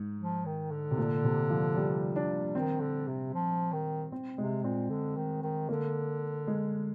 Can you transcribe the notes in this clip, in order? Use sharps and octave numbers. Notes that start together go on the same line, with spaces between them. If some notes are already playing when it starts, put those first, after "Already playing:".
Already playing: G#2
F3
D#3
D3
C3
A#2
C3
F3
G3
D4
D#3 C4
D3
C3
F3
D#3
C4
C3 G#3
A#2 C4
D3
D#3
D#3
D3 A#3
G#3